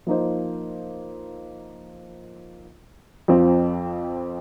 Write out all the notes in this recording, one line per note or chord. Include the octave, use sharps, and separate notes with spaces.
F3 A#3 D#4 C5
F2 F3 C4